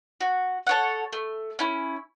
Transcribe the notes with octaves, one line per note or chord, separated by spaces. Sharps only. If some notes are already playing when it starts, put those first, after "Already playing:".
F#4
A4 C#5 F#5
A3
C#4 E4